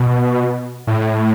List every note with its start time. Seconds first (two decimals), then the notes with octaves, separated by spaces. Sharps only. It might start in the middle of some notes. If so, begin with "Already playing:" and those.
Already playing: B2
0.87 A2